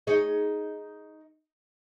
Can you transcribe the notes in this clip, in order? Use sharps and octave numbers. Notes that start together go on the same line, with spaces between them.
D#4 G#4 C#5